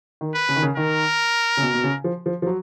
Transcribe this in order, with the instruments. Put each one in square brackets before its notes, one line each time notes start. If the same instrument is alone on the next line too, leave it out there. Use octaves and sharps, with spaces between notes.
[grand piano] D#3
[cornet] B4
[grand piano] C#3
D#3
C#3
[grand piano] D#3 [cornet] A#4
[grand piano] C#3
B2
B2
C#3
F3
F3
F3
F#3